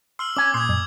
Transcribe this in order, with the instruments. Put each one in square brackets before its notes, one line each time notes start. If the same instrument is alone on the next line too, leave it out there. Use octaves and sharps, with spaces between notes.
[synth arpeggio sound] C6 [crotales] E6 F6 F#7
[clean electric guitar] C#4 G#5 [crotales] D6
[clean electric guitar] A#2 [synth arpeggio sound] C6 [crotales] D#6 G#6
[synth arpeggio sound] F#2